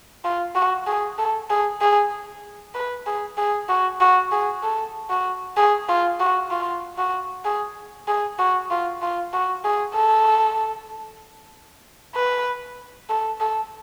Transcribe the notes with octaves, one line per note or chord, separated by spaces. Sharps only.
F4
F#4
G#4
A4
G#4
G#4
B4
G#4
G#4
F#4
F#4
G#4
A4
F#4
G#4
F4
F#4
F4
F#4
G#4
G#4
F#4
F4
F4
F#4
G#4
A4
B4
A4
A4